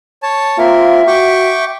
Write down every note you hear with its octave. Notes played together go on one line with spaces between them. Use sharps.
C#5 A5
A#3 C4 F4 A#4 E5
F#4 G5 C#6 D6